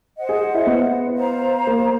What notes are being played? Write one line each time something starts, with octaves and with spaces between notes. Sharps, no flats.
C5 D#5 F#5
G#4
E4
B3
C5 F5 A#5
A#3